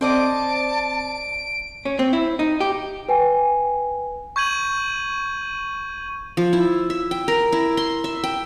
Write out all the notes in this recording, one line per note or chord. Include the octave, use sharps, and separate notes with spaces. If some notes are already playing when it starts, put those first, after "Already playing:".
C4 C5 D5 D#5 A5 D7
C#4
C4
E4
D#4
G4
B4 G5 G#5
C#6 G6 G#6 D#7 F#7
F3
E4
E5
G5
A#4
E4
C6
E5
G5